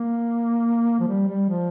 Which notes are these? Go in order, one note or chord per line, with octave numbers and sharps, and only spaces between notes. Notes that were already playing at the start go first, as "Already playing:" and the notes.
Already playing: A#3
F3
G3
G3
F3